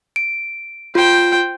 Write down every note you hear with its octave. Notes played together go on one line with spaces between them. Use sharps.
D7
F4 C5 G5